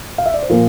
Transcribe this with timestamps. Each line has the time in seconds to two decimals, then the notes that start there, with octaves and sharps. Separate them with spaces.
0.18 F5
0.26 E5
0.34 D5
0.42 C5
0.50 A#2 F3 A#4